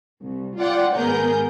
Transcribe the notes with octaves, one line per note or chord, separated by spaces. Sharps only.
C2
F4 D5 F#5 G5
G#1 B3 G#4 A#4 G6